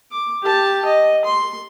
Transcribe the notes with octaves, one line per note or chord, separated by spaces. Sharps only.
D6
G4 A5
D#5
C6